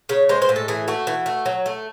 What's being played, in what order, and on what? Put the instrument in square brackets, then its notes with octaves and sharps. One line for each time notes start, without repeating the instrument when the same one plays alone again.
[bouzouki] C#3 C#5
G#3 C5
C5
A2
A4
E3 G#4
A3 F#4
E3
A3
F#3
A3